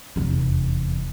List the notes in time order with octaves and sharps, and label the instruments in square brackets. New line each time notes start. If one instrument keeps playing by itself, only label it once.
[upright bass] F1 E2